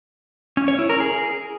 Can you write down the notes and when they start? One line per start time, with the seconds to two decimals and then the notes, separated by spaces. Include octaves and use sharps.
0.57 C#4
0.68 C#5
0.79 E4
0.89 A#4
1.00 G#4